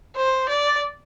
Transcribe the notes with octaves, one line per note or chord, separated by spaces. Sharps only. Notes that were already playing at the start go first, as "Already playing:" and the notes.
C5
D5